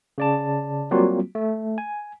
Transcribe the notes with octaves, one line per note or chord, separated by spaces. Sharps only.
C#3 D5 A5
F#3 G3 A#3 C4 F4 F#4
A3
G#5